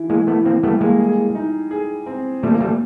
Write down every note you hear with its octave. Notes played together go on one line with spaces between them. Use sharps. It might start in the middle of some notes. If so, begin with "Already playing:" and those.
Already playing: E3 E4
G#3 A#3
E3 A3 B3
A#3 C4
G3 A3 B3
G#3 A#3
G#4
D#4
G#4
C4
A#2 G3 A3
A#3
G3 A3